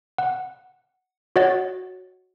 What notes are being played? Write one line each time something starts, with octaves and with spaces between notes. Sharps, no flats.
F#5
F#4 C#5 D#5 F#5 A6